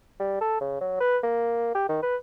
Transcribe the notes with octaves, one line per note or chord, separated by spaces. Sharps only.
G3
A4
C#3
F#3
B4
A#3
G4
D#3
B4